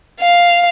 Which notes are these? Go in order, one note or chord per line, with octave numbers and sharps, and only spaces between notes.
F5